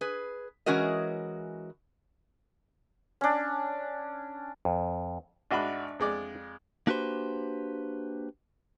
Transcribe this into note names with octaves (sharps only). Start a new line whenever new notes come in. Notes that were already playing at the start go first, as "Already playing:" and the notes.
G#4 B4
E3 G#3 C#4 F#4 A#4 D#5
C#4 D4
F2
G#1 D4 F#4 D#5 E5 B5
F2 G#3 D5
A#3 D4 F#4 G4 B4 C5